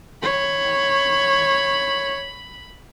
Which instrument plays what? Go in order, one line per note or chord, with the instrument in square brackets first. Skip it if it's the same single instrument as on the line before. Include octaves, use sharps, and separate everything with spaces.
[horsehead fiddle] C#5 [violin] B5